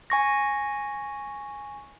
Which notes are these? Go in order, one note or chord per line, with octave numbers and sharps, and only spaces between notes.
G#5 C#6 A#6